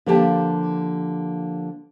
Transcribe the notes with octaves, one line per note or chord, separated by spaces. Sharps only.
D3 F3 A#3 G4 G5 A5